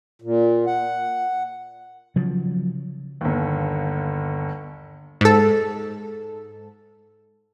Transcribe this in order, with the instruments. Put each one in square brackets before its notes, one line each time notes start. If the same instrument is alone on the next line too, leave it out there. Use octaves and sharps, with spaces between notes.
[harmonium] A#2
F#5
[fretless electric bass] C#3 F3 F#3
[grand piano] G1 D#2
[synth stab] G#2 A4